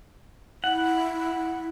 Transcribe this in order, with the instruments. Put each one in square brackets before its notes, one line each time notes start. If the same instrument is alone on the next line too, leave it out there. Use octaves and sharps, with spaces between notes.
[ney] E4 [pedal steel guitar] F#5